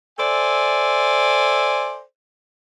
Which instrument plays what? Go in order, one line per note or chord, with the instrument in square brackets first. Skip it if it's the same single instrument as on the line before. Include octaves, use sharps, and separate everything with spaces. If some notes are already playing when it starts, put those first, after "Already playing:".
[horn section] A4 C5 D5 E5 G#5